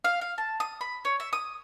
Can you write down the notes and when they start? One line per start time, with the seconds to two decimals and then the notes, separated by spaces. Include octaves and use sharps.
0.04 F5
0.21 F5
0.38 A5
0.60 D#6
0.81 B5
1.05 C#5
1.20 E5
1.33 D#6